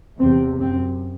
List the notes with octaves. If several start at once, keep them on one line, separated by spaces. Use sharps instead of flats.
E2 C3 C4
F#2 C4